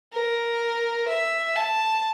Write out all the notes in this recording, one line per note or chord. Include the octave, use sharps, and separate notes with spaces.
A#4
E5
A5